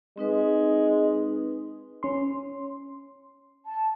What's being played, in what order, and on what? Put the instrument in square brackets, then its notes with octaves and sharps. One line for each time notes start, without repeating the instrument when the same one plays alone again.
[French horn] G#3 [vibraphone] C4 D#4 B4
[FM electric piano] C#4 C6
[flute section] A5